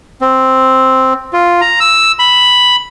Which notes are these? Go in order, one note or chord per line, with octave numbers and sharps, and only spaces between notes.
C4
F4
A#5
E6
B5